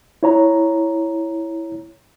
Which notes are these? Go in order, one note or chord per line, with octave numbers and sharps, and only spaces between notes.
E4 C#5 A#5